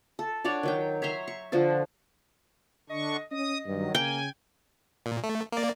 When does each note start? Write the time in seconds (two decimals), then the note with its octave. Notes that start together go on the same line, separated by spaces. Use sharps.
0.19 A4
0.44 D4 F#4 C#5 D5
0.63 D#3 F#3 G5
1.02 C#5 E5 A#5 C6
1.28 C#6
1.52 D3 F3 F#4 A4
2.90 D3 D4 D#5 C#6
3.31 C#4 D#5 D#6
3.66 G2 D#3 F#3
3.95 C#3 A#3 G5 G#5
5.06 A#2
5.24 A3
5.52 A#3 D5